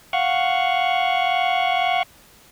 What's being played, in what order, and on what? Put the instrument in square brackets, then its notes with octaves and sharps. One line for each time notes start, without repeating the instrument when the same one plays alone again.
[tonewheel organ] F5 F#5 C#6